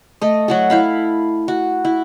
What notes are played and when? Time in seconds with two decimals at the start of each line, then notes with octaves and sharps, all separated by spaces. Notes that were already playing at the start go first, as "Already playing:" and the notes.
0.21 A3 D#5
0.48 F#3 F#4 A4
0.70 E4 F5 B5
1.48 F#4
1.85 E4